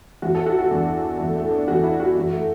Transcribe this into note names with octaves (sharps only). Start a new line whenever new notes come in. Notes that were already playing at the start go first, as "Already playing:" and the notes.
E2 E3 F#4
A4
F#4
F#4
E2 E3 D4
E2 E3 A3
A3
D4
E2 E3 F#4
E4
F#4
F#2 E3 F#4
A3